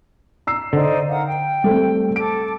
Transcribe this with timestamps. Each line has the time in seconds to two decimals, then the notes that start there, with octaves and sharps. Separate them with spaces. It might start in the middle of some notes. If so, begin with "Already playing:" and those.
0.47 A#5 E6 C7
0.73 D3 D#4 C5 D5
1.09 A#4 F5 F#5
1.25 G5
1.64 G3 A3 C4
2.16 A4 D6 D7